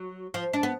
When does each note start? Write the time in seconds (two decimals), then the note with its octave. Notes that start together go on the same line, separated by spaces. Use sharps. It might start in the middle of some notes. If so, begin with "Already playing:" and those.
Already playing: F#3
0.34 F3
0.53 D4
0.63 B3